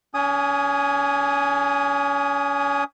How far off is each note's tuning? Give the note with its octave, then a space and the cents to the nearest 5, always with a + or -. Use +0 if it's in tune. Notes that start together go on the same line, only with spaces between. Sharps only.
C#4 +40 G#5 +0 D#6 +0